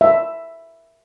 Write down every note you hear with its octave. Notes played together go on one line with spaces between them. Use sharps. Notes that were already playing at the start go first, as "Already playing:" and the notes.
E5